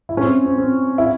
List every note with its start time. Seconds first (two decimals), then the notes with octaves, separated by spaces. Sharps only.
0.09 E4
0.17 C#4
0.21 C4
0.46 C4
0.58 C4
0.98 E4